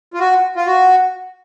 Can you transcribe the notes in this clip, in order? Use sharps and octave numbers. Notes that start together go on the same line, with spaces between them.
F4
F#4
F4
F#4